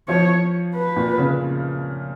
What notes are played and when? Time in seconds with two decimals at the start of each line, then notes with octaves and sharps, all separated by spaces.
0.08 F3 C#5
0.75 B4
0.96 A#2
1.18 C#3